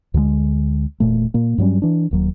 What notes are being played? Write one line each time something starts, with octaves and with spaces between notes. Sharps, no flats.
D2 D3 F#3 G#3
E1 A#2 A3
A#2 A#3
G2 F#3 G3 C#4
E3 D4
D#1 D#2 F#3